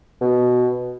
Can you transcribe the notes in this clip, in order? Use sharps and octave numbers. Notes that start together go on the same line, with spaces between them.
B2